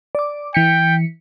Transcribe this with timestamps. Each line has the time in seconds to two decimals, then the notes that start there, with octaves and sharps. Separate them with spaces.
0.15 D5 D6
0.54 E3 G5 B6 C#7